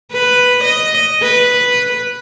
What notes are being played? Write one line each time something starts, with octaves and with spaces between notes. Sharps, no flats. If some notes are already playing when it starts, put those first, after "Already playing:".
B4
D#5
B4